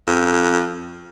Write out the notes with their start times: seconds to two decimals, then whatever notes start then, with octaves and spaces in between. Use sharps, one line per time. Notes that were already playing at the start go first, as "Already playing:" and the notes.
0.07 F2